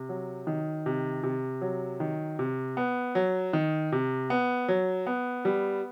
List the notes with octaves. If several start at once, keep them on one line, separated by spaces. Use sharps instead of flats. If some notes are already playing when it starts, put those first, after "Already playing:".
Already playing: C3
F#3
D#3
C3
C3
F#3
D#3
C3
B3
F#3
D#3
C3
B3
F#3
B3
G3